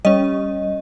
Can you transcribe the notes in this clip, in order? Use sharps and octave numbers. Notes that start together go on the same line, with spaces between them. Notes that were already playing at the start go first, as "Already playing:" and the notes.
G3 C#4 D#5